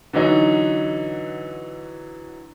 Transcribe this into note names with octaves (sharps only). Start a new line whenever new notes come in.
D3 E3 F#3 D#4